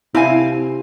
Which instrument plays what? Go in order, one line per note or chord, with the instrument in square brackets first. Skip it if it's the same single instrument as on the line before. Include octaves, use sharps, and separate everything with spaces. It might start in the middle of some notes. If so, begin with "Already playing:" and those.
[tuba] C3 [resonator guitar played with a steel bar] C4 F5 G#5 [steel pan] E4